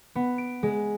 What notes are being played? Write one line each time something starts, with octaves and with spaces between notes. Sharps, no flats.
B3
D7
G#3